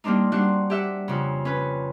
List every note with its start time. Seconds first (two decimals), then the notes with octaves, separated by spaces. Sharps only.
0.04 G3 A#3 C4 D4 D#4
0.32 G3 C4 D4 F#4 F#5
0.70 G4 E5 F#5
1.08 F2 C#3
1.45 C#4 B4